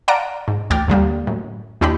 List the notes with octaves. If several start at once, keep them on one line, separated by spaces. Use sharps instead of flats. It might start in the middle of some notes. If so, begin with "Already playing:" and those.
D5 F5 F#5 A5 A#5 D7
G#2
A1 D2 G5 D6 F6 A6
D#2 D3 G3 A#3
F#2 A2
D#2 D4 E4 G4 D#5 B5